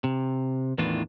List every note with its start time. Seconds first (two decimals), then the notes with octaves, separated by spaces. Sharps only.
0.04 C3
0.78 E2 A2 D#3 E3 D4 F4